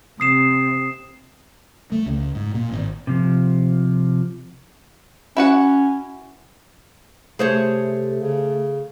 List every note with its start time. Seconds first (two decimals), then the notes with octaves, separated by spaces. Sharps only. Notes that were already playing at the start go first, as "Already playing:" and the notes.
0.20 C3 D#6 C7 E7
1.92 A3
2.06 C#2
2.35 G#2
2.54 A#2
2.71 G#1
3.07 C3 F3
5.37 C#4 E4 F#4 F#5
7.39 C3 A3 G#4 C5 C#5
8.21 C#3